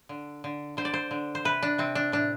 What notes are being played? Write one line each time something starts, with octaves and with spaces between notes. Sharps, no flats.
D3
D3
D3 C5
D5
C5
D3
C5
C3 B4
D4
C3 C4
D4
A2 D4